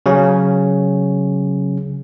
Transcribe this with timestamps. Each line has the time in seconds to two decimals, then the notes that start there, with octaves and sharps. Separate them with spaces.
0.06 C#3 F#3 C#4